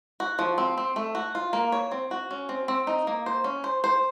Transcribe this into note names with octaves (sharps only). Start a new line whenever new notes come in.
F#4
F3
C4
C4
A3
F#4
F4
A#3
C#5
C4
F#4
C#4
C4
C4
D#4
A#3
C5
C#4
C5
C5